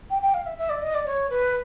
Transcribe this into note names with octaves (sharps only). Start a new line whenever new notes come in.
G5
G5
F5
E5
E5
D5
D#5
D5
C#5
B4